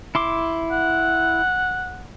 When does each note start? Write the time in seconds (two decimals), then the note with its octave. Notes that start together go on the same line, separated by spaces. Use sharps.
0.15 E4 C6 D6
0.72 F#5